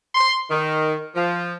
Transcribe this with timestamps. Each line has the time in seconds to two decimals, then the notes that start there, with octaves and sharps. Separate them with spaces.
0.15 C6
0.50 D#3
1.15 F3